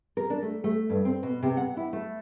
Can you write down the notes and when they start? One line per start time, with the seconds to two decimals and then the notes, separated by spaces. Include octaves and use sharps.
0.17 A#4
0.30 D4
0.42 A3
0.64 A3
0.90 G2
1.05 C4
1.23 B2
1.43 C3
1.57 F#5
1.77 E4
1.93 A3